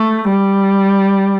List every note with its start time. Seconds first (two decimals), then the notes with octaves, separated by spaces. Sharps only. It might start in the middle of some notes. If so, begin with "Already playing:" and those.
Already playing: A3
0.30 G3